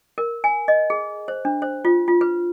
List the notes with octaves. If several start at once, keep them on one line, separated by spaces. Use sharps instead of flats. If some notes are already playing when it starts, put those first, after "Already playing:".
A#4
G#5
D#5
G#4
C5
D4
C5
F4
F4
B4